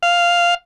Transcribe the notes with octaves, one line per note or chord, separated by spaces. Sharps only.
F5